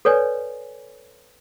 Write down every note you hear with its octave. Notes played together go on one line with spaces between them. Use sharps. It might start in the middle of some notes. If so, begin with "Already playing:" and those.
A4 B4 C#5 D5 G#5